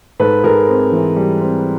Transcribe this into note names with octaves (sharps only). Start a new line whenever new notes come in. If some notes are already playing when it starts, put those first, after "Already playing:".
G#2 A4 B4
G#2 G#4 A#4
C4
E3
G3
C4